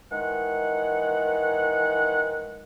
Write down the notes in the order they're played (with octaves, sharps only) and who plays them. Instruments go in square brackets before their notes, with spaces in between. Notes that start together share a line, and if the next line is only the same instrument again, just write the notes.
[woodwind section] D#3 E3 G#3 F#5